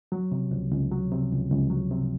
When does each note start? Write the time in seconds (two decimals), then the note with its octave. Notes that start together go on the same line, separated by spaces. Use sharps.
0.12 F#3
0.32 C3
0.51 C#2
0.71 C#2
0.91 F#3
1.12 C3
1.32 C#2
1.51 C#2
1.70 F#3
1.91 C3